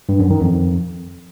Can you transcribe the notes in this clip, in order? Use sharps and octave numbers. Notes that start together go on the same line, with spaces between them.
G2
F#2
D#3
F2